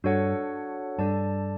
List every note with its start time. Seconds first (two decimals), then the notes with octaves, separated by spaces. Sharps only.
0.04 G2 D4 F#4 A4 C#5 F#5
0.98 G2 D4 A4 D5 A5